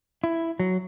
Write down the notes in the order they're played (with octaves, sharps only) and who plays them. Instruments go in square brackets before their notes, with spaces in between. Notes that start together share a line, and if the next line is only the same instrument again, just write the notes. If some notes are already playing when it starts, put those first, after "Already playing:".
[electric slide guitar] E4
F#3